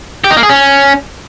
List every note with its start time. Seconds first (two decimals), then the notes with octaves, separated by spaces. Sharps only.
0.24 G4
0.31 D#4
0.37 A#3
0.43 G#4
0.49 C#4